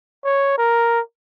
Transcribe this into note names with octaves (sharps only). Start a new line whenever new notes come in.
C#5
A#4